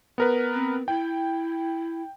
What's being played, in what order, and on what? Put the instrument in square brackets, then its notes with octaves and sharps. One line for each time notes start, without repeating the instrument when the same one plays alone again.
[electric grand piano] B3 A#4 B4
[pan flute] C4
[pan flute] E4 [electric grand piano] G5